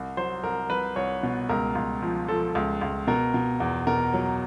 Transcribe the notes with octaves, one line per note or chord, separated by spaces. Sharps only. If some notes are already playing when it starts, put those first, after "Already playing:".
Already playing: C2
F#3 C5
C2 A#4
C2 B4
C2 C#5
B2
C#2 A#4
C#2
F3
F3 A4
C#2
C#2
B2 A#4
B2
E2
B2 A#4
F#3